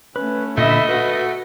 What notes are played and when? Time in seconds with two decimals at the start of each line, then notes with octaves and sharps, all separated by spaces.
0.16 A3 C#4 B4
0.58 A#2 D3 A3 D#5 E5 B5
0.89 F#4 B4